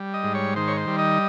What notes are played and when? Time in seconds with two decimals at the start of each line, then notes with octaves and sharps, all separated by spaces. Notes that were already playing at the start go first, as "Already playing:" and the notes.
Already playing: G3
0.14 D#5
0.24 G#2
0.34 C#5
0.56 D#3 C5
0.68 C#5
0.77 C5
0.87 G3
0.98 D#5